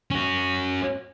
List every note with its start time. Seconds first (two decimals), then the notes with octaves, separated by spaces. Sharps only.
0.11 C#4 F#4